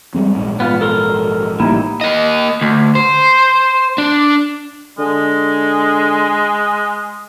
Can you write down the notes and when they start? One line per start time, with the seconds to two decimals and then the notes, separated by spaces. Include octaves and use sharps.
0.14 G3 G#3 C4
0.36 A#1 G#2
0.60 B3 F4
0.81 A4 A#4 C6
1.60 A1 G3 A#3 D#4 E4
2.01 A#3 D#5
2.61 D2
2.95 C5
3.98 D4
4.98 D3 G#3